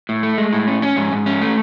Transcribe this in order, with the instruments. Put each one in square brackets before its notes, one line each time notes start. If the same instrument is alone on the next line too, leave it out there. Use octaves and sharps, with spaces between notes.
[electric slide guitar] A2
A3
G#3
A2
C#4
C#4
G#2
G#2
C#4
A3